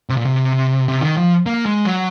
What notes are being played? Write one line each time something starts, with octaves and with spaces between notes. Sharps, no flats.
C3
A#2
C3
C3
D#3
F3
A#3
G#3
F#3